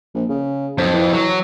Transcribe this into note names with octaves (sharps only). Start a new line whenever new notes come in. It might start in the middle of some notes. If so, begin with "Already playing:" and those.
A#1
C#3
B1 F2
E3
F#3